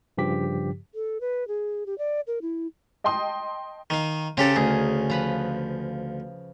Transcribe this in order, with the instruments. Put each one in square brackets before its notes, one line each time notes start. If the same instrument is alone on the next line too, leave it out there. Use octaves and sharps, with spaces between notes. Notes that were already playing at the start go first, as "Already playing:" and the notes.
[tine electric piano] G2 C#3 F3 G4 B6
[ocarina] A4
B4
G#4
G4
D5
A#4
E4
[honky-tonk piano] D#5 G5 A5 C6 D#6
[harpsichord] D#3 F5
[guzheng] C#3 C#4 A#4 [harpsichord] C4 G4 A4
[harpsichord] D2 [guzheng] G#4
[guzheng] F3 B4 B5